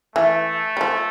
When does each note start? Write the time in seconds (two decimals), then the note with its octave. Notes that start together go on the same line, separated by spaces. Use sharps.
0.16 E3 A3
0.77 G3
0.81 F3